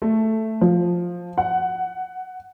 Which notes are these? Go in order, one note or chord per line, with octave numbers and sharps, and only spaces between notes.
A3
F3
F#5